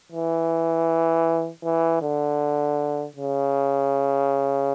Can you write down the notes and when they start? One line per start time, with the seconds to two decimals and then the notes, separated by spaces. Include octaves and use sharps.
0.13 E3
1.64 E3
2.02 D3
3.16 C#3